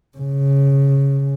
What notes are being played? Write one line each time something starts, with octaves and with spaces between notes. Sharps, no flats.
C#3